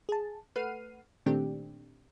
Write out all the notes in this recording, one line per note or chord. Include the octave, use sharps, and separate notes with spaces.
G#4 A5
A3 B4 F#5 F6 C7 D#7
A#2 D#3 A3 C4 D4 G4